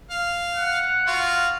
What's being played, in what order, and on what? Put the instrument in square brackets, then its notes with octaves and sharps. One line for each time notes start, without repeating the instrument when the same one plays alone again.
[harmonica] F5
[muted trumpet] F#5
[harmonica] F4 F#4 F5